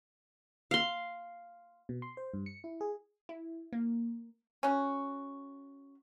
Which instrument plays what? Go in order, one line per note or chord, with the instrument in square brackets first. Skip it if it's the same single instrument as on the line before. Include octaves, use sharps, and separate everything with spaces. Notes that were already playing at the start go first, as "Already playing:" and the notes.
[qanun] F5 C6
[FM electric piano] B2
C6
C5
G2
C#7
E4
G#4
[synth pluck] E4
A#3
[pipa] C#4 F#4